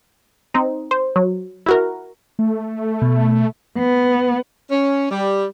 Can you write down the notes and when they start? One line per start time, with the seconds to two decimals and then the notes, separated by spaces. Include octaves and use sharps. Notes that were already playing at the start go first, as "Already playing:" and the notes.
0.54 C4 D#4
0.91 C5
1.16 F#3
1.66 E4 F#4 A#4
2.39 A3
3.02 B2
3.77 B3
4.71 C#4
5.11 G3